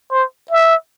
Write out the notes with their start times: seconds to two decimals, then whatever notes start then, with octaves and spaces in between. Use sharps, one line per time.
0.12 C5
0.51 E5